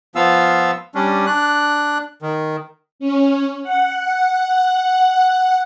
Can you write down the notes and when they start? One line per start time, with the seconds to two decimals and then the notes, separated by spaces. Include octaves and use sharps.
0.15 F3 B3 F4 F5 E6
0.95 G3 C#4 D4
1.27 D4 F#6
2.22 D#3
2.99 C#4
3.63 F#5